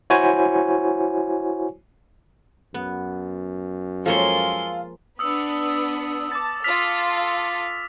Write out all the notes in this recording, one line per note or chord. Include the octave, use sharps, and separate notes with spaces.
E4 F#4 C5 C#5 G#5
F#2 B3
F3 G#3 A#3 F4 A4 C#5 C6
B3 D4 D#6 E6 C#7
A5 D6 A6
F4 A4 F6 B6 F7